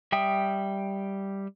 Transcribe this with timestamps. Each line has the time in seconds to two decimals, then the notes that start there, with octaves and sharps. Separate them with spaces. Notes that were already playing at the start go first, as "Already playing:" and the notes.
0.12 G3 E5 G5 D#6